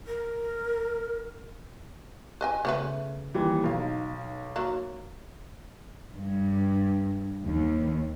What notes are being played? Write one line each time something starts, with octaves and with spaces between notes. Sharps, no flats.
A#4
B4 D#5 G#5
C#3 A3 B3 B4
D#2 E3 G3
B1 D#4 F5
F#3 A#3
G2
D#2